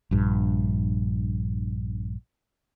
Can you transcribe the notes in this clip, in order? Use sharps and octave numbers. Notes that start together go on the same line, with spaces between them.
A#1 G2